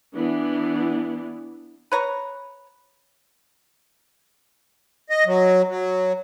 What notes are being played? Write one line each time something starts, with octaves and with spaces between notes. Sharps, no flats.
E3 B3 D4
B4 C#5 A#5
D#5
F#3
F#3